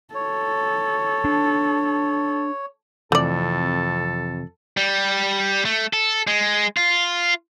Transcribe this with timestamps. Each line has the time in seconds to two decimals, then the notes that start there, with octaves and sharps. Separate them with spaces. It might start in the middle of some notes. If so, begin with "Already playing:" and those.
0.15 A4 C#5
1.25 D4
3.12 F2 C3 E3 A3 A4 D5
4.77 G3
5.65 A3
5.93 A4
6.27 G#3
6.77 F4